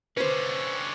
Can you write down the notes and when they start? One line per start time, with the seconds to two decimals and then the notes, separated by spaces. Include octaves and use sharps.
0.17 D3 C#4 B4 C5